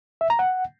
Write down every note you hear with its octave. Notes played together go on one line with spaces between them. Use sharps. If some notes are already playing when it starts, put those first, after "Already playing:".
E5
A#5
F#5